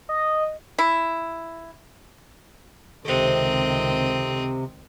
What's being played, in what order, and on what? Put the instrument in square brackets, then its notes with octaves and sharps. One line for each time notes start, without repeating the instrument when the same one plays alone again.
[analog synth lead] D#5
[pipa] E4
[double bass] C#2 D#3 [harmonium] C3 [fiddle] C4 D#5 [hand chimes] A4 C5